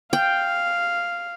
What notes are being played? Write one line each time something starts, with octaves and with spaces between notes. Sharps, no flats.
F5 G5